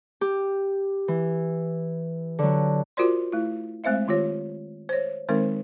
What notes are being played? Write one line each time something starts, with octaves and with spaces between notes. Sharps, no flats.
G4
E3
D3 F#3
F4 F#4 A#4 C5 D5 C6
A3 E4
G#3 A3 C4 C5 E5 F5
D#3 F4 G4 C#5
C5 C#5
D#3 G#3 C4 D#4 A#4 C5